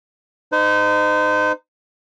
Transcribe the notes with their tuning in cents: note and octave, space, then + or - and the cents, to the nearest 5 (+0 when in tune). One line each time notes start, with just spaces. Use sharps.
D#4 -20 C5 -35